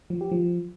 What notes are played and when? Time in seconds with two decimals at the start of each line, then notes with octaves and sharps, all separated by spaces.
0.10 F3
0.21 G4
0.32 F3